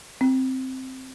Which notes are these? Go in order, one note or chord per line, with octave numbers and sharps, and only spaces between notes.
C4